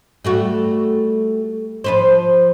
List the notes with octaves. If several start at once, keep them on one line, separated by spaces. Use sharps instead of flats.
G3 A3 F#4
F3 B4 C5